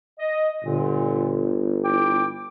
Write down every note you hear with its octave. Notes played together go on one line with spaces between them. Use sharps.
D#5
G1 A#2 D3
E4 G5 D6